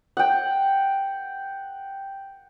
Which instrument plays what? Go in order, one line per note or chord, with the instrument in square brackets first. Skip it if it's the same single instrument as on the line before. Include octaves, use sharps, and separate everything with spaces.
[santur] F#5 G5